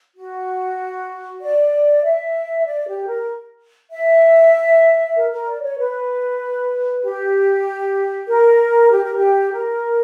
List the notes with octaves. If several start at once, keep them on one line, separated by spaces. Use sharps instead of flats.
F#4
D5
E5
D5
G4
A#4
E5
A#4
A#4
D5
C#5
B4
G4
A#4
G4
A#4
G4
A#4